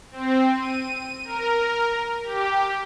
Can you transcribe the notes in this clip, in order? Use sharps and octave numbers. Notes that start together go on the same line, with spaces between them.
C4
D#7
A#4
G4